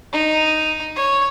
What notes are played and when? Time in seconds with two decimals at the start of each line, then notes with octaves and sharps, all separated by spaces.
0.12 D#4
0.96 C#5